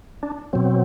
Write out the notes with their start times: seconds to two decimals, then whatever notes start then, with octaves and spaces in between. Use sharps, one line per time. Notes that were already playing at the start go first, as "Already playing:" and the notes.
0.23 D4
0.53 B2 F#3 C4